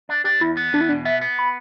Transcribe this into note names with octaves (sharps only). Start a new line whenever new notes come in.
D4
D4 G4
E2 E4
B3
E2 D4
E4
B2 D4
B3 E5
B3
B5